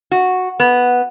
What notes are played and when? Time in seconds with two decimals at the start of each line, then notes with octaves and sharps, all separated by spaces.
0.12 F#4
0.60 B3